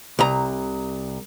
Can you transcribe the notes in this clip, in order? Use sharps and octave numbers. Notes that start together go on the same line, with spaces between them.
C2 A#5